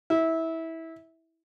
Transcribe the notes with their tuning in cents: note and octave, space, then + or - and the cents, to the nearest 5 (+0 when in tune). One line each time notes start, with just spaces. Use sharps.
E4 -20